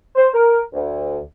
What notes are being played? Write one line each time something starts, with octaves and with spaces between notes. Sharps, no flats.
C5
A#4
D2